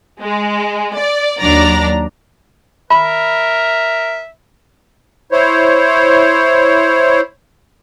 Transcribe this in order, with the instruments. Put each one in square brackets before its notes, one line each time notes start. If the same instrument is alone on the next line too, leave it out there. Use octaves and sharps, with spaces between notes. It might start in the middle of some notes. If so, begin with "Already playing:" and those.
[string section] G#3
D5
D#2 F#3 D4 D5 A#5
[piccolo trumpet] A#4 [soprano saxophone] E5 [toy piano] B5
[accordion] E4 C5 C#5